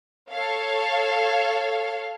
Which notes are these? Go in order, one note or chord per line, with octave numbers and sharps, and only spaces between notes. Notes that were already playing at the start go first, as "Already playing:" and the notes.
A4 C#5 F5